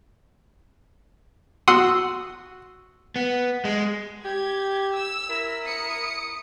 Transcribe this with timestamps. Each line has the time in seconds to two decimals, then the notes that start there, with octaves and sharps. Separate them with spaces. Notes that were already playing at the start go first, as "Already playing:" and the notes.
1.68 F#4 F#5 C6 D#6 E6
3.16 B3
3.65 G#3
4.24 G4 G#6
4.93 E6
5.29 E4 A#4
5.65 D#6 C#7